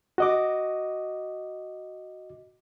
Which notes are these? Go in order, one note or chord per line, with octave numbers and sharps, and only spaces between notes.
F#4 D#5 D6